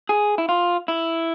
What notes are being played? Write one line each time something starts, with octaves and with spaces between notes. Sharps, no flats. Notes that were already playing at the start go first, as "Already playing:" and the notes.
G#4
E4
F4
E4